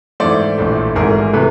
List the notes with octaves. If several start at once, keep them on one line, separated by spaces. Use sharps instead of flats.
G#2 E3 A3 C5 D5
A#1 A2 E3 A3
G#1 G#2 E3 A3 G#4 A#4
C3 E3 A3 A4 B4